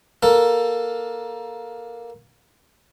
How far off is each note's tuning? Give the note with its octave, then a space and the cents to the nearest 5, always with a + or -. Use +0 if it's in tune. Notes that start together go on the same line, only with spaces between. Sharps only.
A#3 +15 A4 +15